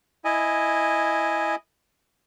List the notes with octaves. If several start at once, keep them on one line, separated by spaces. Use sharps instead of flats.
E4 D#5 G#5